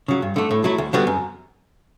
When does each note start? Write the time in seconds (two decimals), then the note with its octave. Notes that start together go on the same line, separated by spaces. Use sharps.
0.08 C#3 F#3
0.22 G2
0.36 D3 A3
0.51 A2
0.64 F#3 A3 E4
0.78 D2
0.93 D3 G3 B3 F#4
1.07 F#2